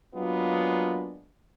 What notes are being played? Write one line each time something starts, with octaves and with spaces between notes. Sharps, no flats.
F#3 G#3 A#3 B3 D4 F4